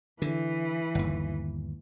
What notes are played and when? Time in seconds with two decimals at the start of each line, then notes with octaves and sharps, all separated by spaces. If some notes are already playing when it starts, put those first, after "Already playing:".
0.22 D3 E3
0.95 G1 D#2